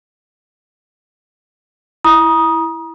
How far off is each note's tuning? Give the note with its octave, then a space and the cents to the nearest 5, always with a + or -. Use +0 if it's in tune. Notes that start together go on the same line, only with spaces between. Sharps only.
E4 +0 A#5 +40 D#6 +0